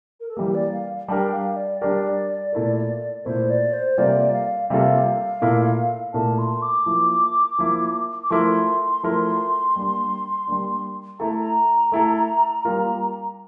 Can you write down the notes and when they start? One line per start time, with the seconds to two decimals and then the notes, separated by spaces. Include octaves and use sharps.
0.20 A#4
0.29 A4
0.37 E3 G3 A#3 G4
0.54 D5
0.72 F5
1.08 G3 D4 G4 A#4 G5 A5
1.33 F5
1.56 D5
1.80 G3 D4 G4 A#4 D5
2.52 A#2 A3 E4 A#4
3.25 A#2 A3 E4 A#4 C5
3.50 D5
3.73 C5
3.98 C3 G3 A#3 F4 A4 D5
4.33 F5
4.69 C3 G3 A#3 F4 A4 F5
5.42 A#2 A3 E4 A#4
6.14 A#2 A3 E4 A#4 A5
6.38 C6
6.62 D6
6.86 F3 A#3 E4
7.59 F3 A#3 E4
8.23 D6
8.30 F3 A3 E4 A#4 C6
9.03 F3 A3 E4 A#4
9.76 G3 A#3 D4
10.47 G3 A#3 D4
11.20 A3 E4 A4 A#5
11.92 A3 E4 A4
12.65 G3 A#3 F4 A#4